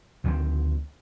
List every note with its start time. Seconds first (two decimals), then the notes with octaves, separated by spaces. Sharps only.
0.24 D2 D#3 F3 C4